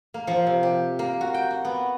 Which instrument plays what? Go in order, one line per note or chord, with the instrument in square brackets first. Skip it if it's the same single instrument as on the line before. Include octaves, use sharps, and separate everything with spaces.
[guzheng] A#3
F3
C3
G4
A#3
F#4
G5
F#4
B3